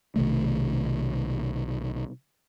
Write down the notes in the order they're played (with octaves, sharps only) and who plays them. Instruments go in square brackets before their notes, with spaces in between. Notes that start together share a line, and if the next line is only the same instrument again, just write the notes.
[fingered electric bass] B1 C3 D#3 A3